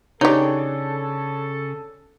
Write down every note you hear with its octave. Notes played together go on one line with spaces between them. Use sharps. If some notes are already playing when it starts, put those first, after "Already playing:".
C#3 D4 D#4 G4 A4 C#5